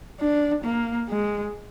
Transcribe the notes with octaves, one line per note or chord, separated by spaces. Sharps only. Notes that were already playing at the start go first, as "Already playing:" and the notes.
D4
A#3
G#3